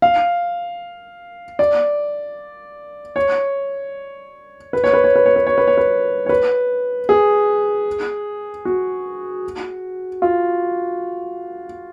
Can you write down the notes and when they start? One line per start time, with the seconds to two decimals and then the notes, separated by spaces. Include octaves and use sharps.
0.02 F5
1.59 D5
3.16 C#5
4.73 B4
4.84 C#5
4.93 B4
5.04 C#5
5.16 B4
5.26 C#5
5.36 B4
5.46 C#5
5.58 B4
5.67 C#5
5.78 B4
6.26 C#5
6.29 B4
7.09 G#4
8.65 F#4
10.22 F4